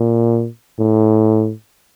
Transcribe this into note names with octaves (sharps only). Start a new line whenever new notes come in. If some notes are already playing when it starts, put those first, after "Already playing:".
Already playing: A#2
A2